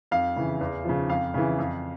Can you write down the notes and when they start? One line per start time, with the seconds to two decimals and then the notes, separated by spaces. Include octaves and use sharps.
0.11 F2 F5
0.36 C#3 E3
0.61 E2
0.85 C#3 F3
1.10 F2 F5
1.34 C#3 E3
1.59 F2